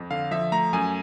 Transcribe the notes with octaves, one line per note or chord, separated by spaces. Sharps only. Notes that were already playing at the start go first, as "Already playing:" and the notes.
Already playing: F2
D3 F5
F3 E5
A3 A#5
F#2 G#5